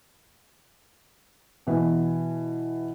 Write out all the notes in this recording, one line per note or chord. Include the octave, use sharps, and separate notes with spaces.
B2 E3